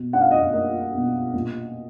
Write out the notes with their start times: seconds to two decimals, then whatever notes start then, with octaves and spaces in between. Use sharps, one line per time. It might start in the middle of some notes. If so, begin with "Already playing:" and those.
Already playing: B2
0.13 D4 F#5
0.21 F5
0.31 D#5
0.39 F5
0.53 A#3 D#5
0.94 B2
1.34 A#2